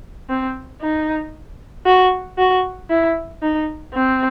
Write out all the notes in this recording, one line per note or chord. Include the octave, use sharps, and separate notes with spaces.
C4
D#4
F#4
F#4
E4
D#4
C4